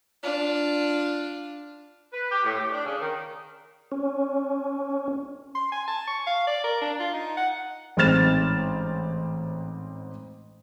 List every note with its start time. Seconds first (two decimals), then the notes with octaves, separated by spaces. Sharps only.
0.23 D4 F4
2.13 B4
2.31 G4
2.44 A2
2.58 G4
2.72 D4
2.85 C#3
3.01 D#3
3.92 C#4
5.55 C6
5.72 G#5
5.88 A5
6.07 C#6
6.27 F5
6.47 D5
6.64 A#4
6.82 D4
7.00 F4
7.13 D#4
7.37 F#5
7.97 A1 G#2 C4 F6 A6 E7